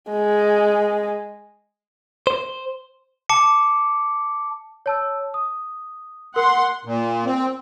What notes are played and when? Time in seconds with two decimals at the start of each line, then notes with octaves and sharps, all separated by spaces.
0.11 G#3
2.27 C5
3.29 A5 D6 C#7
4.86 C#5 A5 E6
5.34 D#6
6.36 A#4 F#5 C6
6.85 A#2
7.25 C4